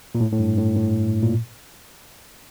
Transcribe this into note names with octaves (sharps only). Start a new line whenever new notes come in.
A#2
A2
A2
G2
A2
A2
A#2